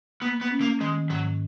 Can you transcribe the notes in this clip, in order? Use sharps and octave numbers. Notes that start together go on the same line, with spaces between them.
A#3 B3
B3
C#4
A#3
D#3 G#3
G#2 F#3